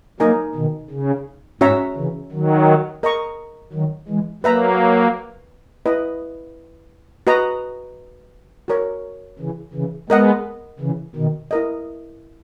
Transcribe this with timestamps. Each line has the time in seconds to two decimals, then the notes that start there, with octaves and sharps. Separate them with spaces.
0.20 F#3 A#3 D#4 A#4 D#5 G#5
0.55 B2 D#3
0.90 C#3
1.61 G#2 C#4 F#4 C#5 E5 A#5
1.96 C#3 E3
2.32 D#3 F#3
3.03 A#4 D#5 A#5 C#6
3.73 D#3 F#3
4.08 E3 G#3
4.44 F#3 A#3 B4 E5 A#5
5.86 E4 B4 D#5
7.27 F#4 B4 D#5 A#5
8.68 F#4 A#4 C#5
9.39 C#3 E3
9.73 C#3 E3
10.09 G#3 B3 A#4 D#5 F#5
10.80 C#3 E3
11.15 B2 D#3
11.51 E4 A#4 D#5